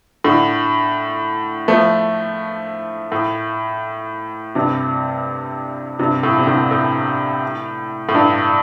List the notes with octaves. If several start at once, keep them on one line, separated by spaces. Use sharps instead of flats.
A2 D3
F3 A3
A2
G2 C3
G2 C3
A2
C3
A2 D3
A2
A2
G2